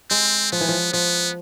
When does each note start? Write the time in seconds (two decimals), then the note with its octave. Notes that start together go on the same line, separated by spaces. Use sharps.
0.10 G#3 C4
0.52 F3 B3
0.61 E3
0.69 F3
0.93 F3 B3